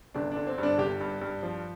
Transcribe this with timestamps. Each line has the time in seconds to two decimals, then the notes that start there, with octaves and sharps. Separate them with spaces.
0.14 G1 D4
0.32 D3 D4
0.47 C4
0.58 G2
0.63 D4
0.78 G1 G4
1.01 G2
1.21 G2
1.43 F3